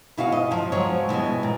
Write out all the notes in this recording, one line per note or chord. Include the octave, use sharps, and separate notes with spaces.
B2 E4 F#4 G#4 C#5 F5
D#5
F3 F#3
F3 F#3 G#3 B3 C#5
B2 E3 G3 G#3
A#2